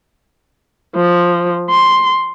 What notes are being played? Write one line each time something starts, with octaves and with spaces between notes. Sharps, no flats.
F3
C6